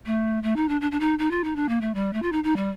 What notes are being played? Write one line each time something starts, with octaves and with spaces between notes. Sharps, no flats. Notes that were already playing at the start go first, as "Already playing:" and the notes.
A3
A3
D#4
D4
D4
D4
D#4
D#4
F4
D#4
D4
A#3
A3
G3
A3
F4
D#4
D#4
G3